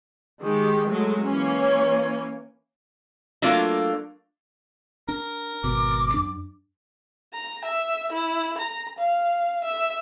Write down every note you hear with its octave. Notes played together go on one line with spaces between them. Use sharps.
D#3 G#3 G4
F#3 G#3 A3
E3 A#3 C#4
C#5
F#3 A3 A#3 D4 F4
D4 A#4
G#1 B2 D6
F#2 D4
A#5
E5
E4
A#5
F5
E5